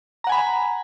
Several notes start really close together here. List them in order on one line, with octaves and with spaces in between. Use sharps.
A#5 F#5 G#5 B5